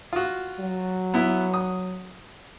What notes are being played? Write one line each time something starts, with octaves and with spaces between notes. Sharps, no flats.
F4 F#4
F#3
B3 E4
D#6